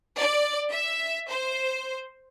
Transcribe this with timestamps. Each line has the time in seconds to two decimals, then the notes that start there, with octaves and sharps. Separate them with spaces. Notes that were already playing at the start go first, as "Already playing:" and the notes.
0.17 D5
0.71 E5
1.29 C5